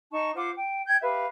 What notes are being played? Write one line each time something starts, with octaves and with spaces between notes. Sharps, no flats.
D#4 A5 C#6
F4 C5 F#5 D6
G5
G5 G6 G#6
G4 B4 E5 F5